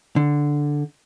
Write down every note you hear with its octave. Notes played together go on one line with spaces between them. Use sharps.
D3